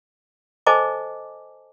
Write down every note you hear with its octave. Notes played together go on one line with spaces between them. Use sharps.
A4 C5 D#5 G#5 A5 D6